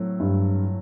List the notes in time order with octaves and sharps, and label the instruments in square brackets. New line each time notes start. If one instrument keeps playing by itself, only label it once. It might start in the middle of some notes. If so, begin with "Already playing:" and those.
Already playing: [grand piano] A2 F#3 A3 C4
[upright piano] G2